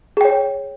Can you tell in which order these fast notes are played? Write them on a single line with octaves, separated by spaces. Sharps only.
G#4 G5 C#5